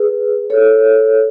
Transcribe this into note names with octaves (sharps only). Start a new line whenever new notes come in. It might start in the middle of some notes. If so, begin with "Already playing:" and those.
Already playing: G#4 B4
A4 C#5